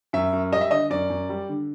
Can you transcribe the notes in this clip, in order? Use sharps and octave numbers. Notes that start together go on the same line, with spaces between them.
F#2 E5
F#2
G3 D#5
E5
D3 D#5
F#2 D5
F#2
G3
D3